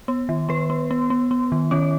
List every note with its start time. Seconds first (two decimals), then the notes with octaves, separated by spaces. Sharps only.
0.08 B3
0.29 D#3
0.49 D#3 B3 B4
0.70 B3
0.91 B3
1.10 B3
1.31 B3
1.52 D#3
1.71 D#3 C#4 C#5